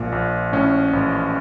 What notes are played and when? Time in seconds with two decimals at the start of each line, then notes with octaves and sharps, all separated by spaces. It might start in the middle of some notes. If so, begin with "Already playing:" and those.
Already playing: A#1 A#2
0.12 A#1
0.53 A2 C#4
0.93 A1